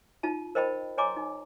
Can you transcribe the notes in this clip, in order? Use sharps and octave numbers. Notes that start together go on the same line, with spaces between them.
D#4 F4 A5
A#4 C5 D#5 G5 A5 B5
C#5 D#5 G#5 A#5 C6 D6
D#4